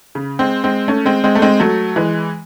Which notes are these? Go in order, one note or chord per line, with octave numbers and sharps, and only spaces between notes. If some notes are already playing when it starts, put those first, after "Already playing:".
C#3
G#3 C4
G#3 C4
A3 C#4
G#3 C4
G#3 C4
A3
G#3 C4
F#3 A3
E3 G#3